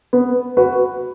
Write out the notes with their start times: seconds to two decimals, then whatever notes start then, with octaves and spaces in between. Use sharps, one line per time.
0.13 B3
0.57 F#4 B4